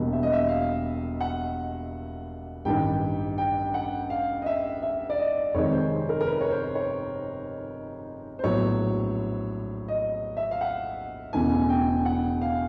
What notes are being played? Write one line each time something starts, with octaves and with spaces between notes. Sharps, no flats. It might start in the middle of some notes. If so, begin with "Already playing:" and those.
Already playing: E1 E2 B2 G3 A#3
E5
D#5
E5
F5
F#5
A1 G2 D#3 G3 G5
G5
F#5
F5
D#5
E5
E5
D5
D#5
F1 F2 C3 D#3 G#3 C#5
C5
A#4
A#4
B4
C#5
C5
C#5
C5
A#1 A2 F#3 B3 C#5
D#5
E5
F5
F#5
E1 E2 C#3 E3 A3 G#5
G5
F#5
F5